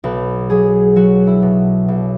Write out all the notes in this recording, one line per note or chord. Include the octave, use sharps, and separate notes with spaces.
B1 B4
F#3 G#4
F#3 F#4
E4
B2
B1